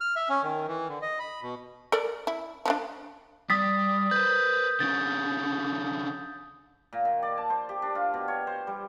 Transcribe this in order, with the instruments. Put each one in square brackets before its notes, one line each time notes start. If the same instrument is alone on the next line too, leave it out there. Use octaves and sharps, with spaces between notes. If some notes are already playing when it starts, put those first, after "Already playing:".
[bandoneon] F6
E5
C#4
D#3
E3
D3
D#5
B5
B2
[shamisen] A4 A#4 D5
E4
F3 B3 D4
[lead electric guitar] G3 [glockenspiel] D#6 A6 B6
[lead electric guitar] B4 C5 [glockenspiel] G6
[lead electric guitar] D3 C#4 [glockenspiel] A6
[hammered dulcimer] A#2
D#3
D5
A5
C5
G4
D4
F4
B2
C#5
C5
G3